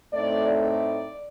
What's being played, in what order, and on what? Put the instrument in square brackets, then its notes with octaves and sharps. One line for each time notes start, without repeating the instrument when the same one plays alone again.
[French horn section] A2 A3 C4 D#4 D5
D5